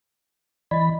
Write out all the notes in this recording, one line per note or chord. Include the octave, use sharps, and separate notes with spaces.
E3 D5 D#5 B5